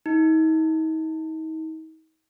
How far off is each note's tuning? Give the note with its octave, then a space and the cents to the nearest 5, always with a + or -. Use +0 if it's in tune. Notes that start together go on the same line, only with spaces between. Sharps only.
D#4 +40